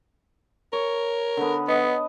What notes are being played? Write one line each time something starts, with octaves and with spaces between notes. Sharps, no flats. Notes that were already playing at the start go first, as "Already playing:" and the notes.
A#4 C#5
D3 B3
B3 D#5